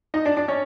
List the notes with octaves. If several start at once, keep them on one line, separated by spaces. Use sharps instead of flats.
D#4 D#5
D4 D5
D4 D5
C#4 C#5